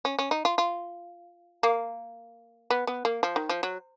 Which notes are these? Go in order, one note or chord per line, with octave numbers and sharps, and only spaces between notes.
C#4
C#4
D#4
F4
F4
A#3
B3
B3
A#3
F3
D#3
F3
F#3